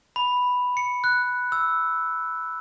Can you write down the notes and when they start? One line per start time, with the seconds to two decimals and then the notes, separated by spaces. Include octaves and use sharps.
0.16 B5
0.77 C#7
1.04 F#6
1.52 E6